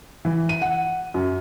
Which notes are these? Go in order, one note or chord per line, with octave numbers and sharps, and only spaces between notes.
E3
D#7
F#5
F#2